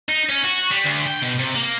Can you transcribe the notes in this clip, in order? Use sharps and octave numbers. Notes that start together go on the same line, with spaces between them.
D#4
C#4
F#4
G3
D2
G5
B2
C3
A#3